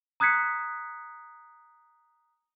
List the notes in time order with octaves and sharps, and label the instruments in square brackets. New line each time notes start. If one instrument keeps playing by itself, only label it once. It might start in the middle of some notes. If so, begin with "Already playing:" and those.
[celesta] A#5 D#6 F#6 G#6 B6 C#7